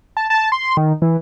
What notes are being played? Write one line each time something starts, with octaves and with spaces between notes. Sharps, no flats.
A5
A5
C6
D#3
E3